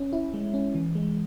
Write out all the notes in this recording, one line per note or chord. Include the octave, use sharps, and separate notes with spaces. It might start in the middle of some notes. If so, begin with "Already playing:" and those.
Already playing: C#4
E4
G#3
C#4
E3
G#3